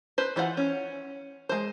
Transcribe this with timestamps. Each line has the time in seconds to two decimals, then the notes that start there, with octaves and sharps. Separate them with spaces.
0.18 B4 C5
0.36 E3 F4 C5 F#5
0.57 C#4
1.49 G#3 C5